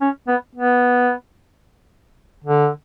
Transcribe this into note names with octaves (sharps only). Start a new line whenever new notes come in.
C#4
B3
B3
D3